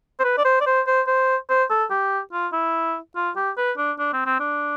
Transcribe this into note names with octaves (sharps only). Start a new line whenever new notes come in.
C5
B4
D5
C5
D5
C5
C5
C5
C5
A4
G4
F4
E4
F4
G4
B4
D4
D4
C4
C4
D4